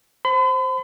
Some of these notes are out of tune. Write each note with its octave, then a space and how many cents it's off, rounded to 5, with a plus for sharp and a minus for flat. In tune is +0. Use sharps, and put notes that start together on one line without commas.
C5 +5 B5 +45